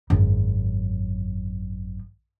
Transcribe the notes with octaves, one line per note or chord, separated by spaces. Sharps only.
G#1 F#2